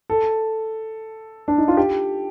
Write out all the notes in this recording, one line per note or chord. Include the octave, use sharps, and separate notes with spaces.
A4
D4
D#4
F4
G4